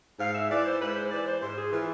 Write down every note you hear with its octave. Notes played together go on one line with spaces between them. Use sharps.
G#2 F5
E5
E3 D5
C5
G#2 B4
C5
E3 D5
C5
G#2 C5
G#4
E3 F4